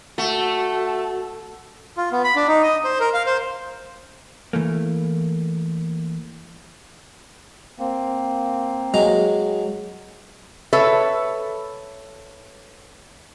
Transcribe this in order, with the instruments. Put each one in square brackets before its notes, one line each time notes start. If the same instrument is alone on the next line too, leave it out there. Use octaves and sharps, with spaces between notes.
[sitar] A3 [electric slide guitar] F#4 [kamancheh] A4
[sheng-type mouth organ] F4
B3
B5
D4
D#4
D#5
C5
A#4
F5
C5
[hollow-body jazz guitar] E3 A3 A#3
[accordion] A#3 C4
[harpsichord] F#3 G#3 A#5
[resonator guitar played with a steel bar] A4 B4 C#5 E5